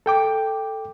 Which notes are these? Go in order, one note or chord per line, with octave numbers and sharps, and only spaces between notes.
A4 G5 D6